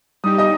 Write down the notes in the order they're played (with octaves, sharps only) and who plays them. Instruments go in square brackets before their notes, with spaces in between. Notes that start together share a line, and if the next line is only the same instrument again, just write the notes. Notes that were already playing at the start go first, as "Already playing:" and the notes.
[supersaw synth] G3 D#4 G4 [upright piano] D#6
[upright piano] D#5 D#6